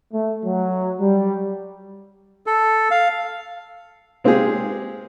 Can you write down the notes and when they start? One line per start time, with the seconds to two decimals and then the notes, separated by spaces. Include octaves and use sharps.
0.13 A3
0.45 F#3
1.00 G3
2.46 A4
2.91 F5
4.24 G#3 C4 F4 G4 G#4